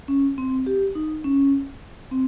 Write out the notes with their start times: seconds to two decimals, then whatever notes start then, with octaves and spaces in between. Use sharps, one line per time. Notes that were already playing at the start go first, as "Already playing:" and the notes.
0.08 C#4
0.38 C4
0.66 G4
0.95 D#4
1.24 C#4
2.11 C4